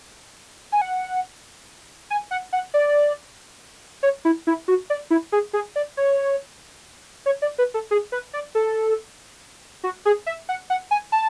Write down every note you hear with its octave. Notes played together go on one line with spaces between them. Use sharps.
G#5
F#5
G#5
F#5
F#5
D5
C#5
E4
E4
F#4
D5
E4
G#4
G#4
D5
C#5
C#5
D5
B4
A4
G#4
B4
D5
A4
F#4
G#4
E5
F#5
F#5
G#5
A5